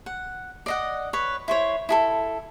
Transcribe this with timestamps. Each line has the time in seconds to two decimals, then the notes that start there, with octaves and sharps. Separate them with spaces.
0.06 F#5
0.66 D5 D#5 F#5
1.13 B4 C#5
1.48 E4 C5 C#5
1.89 E4 G#4 A4